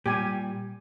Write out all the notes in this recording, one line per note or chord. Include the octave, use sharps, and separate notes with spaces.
A#2 G3 G4 G#5